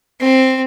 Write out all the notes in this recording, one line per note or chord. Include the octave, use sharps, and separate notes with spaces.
C4